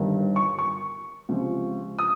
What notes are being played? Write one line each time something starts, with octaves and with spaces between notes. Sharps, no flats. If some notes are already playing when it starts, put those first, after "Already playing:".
Already playing: G1 G2 D#3
C#6
C#6
C#2 C3 F3
D#6